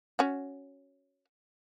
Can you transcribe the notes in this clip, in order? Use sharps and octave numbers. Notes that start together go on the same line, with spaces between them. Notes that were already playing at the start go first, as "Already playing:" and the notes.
C#4 F#4